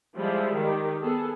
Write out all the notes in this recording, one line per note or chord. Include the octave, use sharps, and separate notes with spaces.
F3 G3 G#3 E4
D#3 G4
B3 G#4 A4